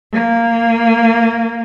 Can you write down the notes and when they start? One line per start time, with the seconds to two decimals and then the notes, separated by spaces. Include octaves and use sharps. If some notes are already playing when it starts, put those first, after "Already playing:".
0.12 A#3